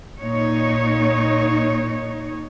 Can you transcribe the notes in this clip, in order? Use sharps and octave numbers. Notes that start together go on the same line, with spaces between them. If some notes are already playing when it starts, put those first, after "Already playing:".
A#2 D#4 C#5